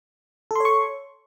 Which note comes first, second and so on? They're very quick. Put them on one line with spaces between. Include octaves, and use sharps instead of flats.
A4 C6 C#5 C#6